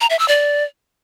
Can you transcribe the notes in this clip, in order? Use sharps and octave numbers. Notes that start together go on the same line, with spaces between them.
A#5
E5
E6
D5